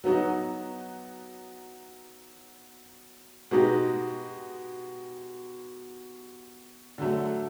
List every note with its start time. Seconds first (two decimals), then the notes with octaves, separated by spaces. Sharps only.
0.04 F#3 B3 D#4 F#4
3.51 B2 G#3 B3 D#4 G4
6.98 D3 F#3 A3